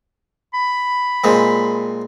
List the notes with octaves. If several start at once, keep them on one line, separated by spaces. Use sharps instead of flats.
B5
A#2 G#3 C4